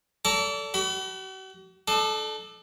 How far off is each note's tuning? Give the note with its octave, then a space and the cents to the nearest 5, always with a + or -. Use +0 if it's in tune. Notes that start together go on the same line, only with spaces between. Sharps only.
A4 +5 D5 -35 A#5 +0
F#4 +45 B5 +10
D4 +35 A4 -20